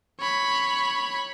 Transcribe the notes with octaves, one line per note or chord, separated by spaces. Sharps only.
C#5 B5